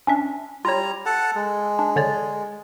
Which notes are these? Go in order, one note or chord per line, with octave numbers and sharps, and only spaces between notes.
C#4 D4 E5
G3 F4 C#5 A#5
A4 F#5 A5
G#3
D4
D3 C#5 D5